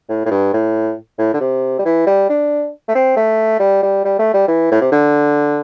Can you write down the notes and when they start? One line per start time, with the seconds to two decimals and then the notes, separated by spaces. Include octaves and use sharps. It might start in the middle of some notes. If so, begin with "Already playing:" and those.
0.09 A2
0.26 A2
0.30 G2
0.54 A2
1.19 A2
1.34 D3
1.40 C3
1.79 G3
1.85 E3
2.07 G3
2.29 D4
2.88 A3
2.95 C4
3.17 A3
3.60 G3
3.83 G3
4.05 G3
4.19 A3
4.34 G3
4.48 E3
4.72 A2
4.82 C3
4.92 D3